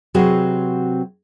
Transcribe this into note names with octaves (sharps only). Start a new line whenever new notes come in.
C3 F#3 C4 F#4 G#4 B4